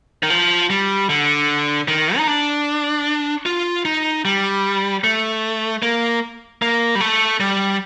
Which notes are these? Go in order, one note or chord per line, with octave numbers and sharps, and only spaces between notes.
D#3
F3
G3
D3
D#3
D#4
D4
F4
D#4
G3
A3
A#3
A#3
G3
A3
G3